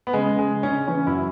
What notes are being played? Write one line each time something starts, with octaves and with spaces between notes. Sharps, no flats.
B3
C#3 G#3
C#3
G#3
C#3
C#4
C#3
E3 C#4
F#2 E4